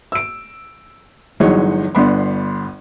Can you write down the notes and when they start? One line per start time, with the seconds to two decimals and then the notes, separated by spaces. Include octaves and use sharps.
0.12 E6 D7
1.40 G1 E3 F#3 G#3 D#4 C#5
1.95 G1 B3 D4 B5 C6